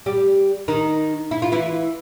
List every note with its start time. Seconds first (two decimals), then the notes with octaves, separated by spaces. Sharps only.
0.06 G3 G4
0.68 D#3 D#4
1.31 E4
1.42 F4
1.52 E3 E4